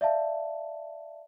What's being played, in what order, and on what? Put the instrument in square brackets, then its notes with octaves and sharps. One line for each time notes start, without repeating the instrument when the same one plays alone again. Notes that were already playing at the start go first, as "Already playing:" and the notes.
[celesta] D5 E5 F5 A5